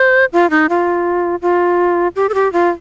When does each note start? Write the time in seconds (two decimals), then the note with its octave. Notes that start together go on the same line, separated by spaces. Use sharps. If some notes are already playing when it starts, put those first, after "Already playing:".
Already playing: C5
0.33 F4
0.50 D#4
0.69 F4
1.42 F4
2.16 G4
2.29 A4
2.34 G4
2.53 F4